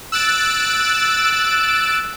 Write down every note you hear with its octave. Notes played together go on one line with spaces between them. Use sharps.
E6 F#6 A6 D7